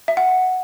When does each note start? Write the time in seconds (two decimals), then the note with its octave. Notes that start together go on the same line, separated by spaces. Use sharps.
0.08 E5
0.17 F#5